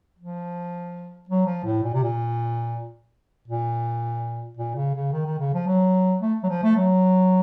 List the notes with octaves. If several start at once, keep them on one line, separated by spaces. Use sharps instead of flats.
F3
F#3
F3
A2
A#2
C3
A#2
A#2
A#2
C#3
C#3
D#3
D#3
C#3
F3
F#3
A3
F#3
F3
A3
F#3